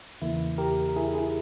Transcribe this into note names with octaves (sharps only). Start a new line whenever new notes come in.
E2 C#3 E3 A#3 E4
G4 A#4
A#4
E4 G#4
E4 G#4